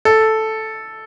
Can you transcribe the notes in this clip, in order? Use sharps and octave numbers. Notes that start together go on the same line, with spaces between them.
A4